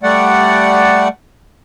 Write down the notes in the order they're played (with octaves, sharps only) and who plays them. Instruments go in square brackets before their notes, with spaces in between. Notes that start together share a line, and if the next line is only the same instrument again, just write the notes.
[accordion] G3 A3 D5 F#5